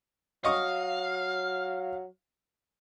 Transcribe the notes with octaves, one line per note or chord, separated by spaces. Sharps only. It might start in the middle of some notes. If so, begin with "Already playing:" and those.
F#3 D#5 F5 C#6 D#6